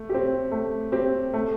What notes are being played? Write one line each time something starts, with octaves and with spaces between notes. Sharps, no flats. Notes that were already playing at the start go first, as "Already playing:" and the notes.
Already playing: A3
C4 G4
A3
C4 G4
A3